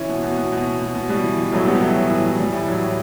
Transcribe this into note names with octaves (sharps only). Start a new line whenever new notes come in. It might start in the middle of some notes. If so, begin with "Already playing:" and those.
Already playing: E3 C#4 E4
B2
B2
B2
B2
B2
B2
B2
B2 G3
E3
E3
A2 F#3 A3
A2 G3 B3
E3 F#3 A3
A2
E3
E3
E3 G3
A2
E3 F#3
A2